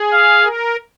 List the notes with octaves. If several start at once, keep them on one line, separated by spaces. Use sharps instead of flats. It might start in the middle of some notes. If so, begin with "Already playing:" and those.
Already playing: G#4
F5
A#4